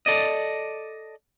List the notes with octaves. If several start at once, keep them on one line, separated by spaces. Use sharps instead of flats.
A4 D5 D#5